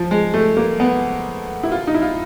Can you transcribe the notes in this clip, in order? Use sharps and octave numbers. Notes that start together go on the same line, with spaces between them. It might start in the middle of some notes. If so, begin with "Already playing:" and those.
Already playing: F3
G#3
A3
A#3
B3
E4
F4
D#4
E4
F4